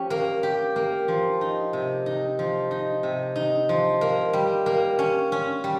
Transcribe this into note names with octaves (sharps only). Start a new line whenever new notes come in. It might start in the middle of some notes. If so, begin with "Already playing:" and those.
Already playing: F3 C#4 G4
A#3
G4
A#3
F3
D#4
C3
D#4
F3
D#4
C3
D#4
F3
A#3
G3
A#3
C#4
C#4
G3